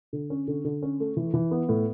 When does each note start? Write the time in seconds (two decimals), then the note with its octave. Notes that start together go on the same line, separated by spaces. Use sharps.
0.13 D3
0.30 C#4
0.48 D3
0.65 D3
0.82 C#4
1.00 A3
1.17 E3
1.34 E3
1.51 B3
1.69 A2